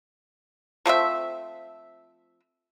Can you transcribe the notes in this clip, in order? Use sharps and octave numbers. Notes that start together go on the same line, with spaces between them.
F3 A3 C4 E5